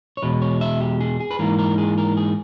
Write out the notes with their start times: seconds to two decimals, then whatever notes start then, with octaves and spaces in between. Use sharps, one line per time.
0.17 C#5
0.22 E2 B2 G#3 B4
0.42 C#5
0.61 E5
0.81 G4
1.01 G#4
1.20 G#4
1.31 B4
1.39 G#2 E3 A#3 A#4
1.59 A#4
1.78 G#4
1.98 A#4
2.17 G#4